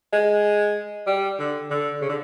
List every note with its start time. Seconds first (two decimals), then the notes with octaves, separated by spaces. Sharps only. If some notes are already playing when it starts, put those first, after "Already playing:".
0.13 G#3
1.07 G3
1.39 D3
1.70 D3
2.02 C#3
2.09 D3